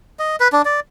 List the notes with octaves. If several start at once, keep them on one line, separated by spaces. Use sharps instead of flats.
D#5
B4
D4
D5